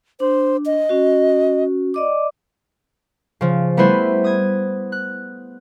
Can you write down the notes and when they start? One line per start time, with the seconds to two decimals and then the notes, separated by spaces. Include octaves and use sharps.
0.20 D4 C5
0.66 D#5
0.89 C#4 F#4
1.94 D5 D#5 D6
3.41 C#3 F3
3.77 G3 A3 B3 E4 B4 C5
4.24 D#6 G#6
4.92 F#6